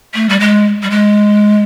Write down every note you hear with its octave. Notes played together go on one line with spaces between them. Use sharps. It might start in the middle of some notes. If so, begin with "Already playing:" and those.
A3
G3
G#3
G3
G#3